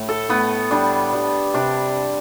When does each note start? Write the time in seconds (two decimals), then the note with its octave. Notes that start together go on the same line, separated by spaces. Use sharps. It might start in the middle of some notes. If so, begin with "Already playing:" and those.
Already playing: A2
0.09 A4
0.29 A2 B3
0.71 G3 D4
1.13 G3
1.54 C3 D4